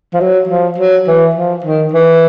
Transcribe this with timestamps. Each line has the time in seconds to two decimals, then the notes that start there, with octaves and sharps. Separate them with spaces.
0.14 F3
0.20 F#3
0.49 F3
0.78 F#3
1.07 E3
1.35 F3
1.64 D#3
1.94 E3